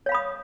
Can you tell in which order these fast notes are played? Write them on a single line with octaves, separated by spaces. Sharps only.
C#5 F5 B5 D#6